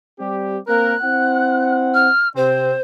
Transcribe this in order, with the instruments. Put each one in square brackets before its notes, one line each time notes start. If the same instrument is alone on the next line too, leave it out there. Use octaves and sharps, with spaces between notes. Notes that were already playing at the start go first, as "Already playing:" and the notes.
[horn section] G3 C4 G4
[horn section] A#3 C4 A#4 [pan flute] F#6
[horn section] C4 E4 F#5
[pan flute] F6
[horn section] C3 C4 [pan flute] C5